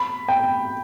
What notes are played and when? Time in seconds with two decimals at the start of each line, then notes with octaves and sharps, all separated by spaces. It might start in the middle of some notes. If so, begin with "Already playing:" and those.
Already playing: B5
0.28 G5